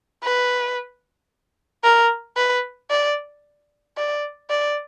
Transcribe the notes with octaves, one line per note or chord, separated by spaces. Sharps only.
B4
A#4
B4
D5
D5
D5